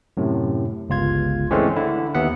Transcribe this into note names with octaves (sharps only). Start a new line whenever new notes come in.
F#2 A2 C3
G1 C#2 F4 G#6
E3 G#3 A3 C4 C#4
D3 E4
D#2 B3 E5 F#5